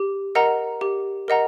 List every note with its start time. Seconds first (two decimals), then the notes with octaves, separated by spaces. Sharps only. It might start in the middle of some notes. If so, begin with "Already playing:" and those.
Already playing: G4
0.35 A#4 D#5 F#5 A#5
0.81 G4
1.28 A#4 D#5 F#5 A#5